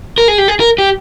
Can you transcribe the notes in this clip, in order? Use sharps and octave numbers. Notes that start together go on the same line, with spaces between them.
A#4
G#4
G4
G#4
A#4
G4